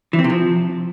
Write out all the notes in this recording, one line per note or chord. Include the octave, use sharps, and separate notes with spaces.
E3
C4
C3
F3